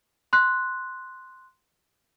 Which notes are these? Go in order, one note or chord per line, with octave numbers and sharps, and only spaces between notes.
C6 F#6